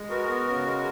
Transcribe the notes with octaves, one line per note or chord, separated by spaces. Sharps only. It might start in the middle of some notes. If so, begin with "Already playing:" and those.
Already playing: G#3
B3 F#4 A#4
B3
C#3
G#3